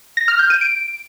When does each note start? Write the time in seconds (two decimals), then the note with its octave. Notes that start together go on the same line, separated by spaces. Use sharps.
0.17 A#6
0.28 F6
0.39 G6
0.50 D#7
0.61 D7